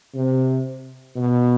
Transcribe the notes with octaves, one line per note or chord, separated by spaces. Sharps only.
C3
B2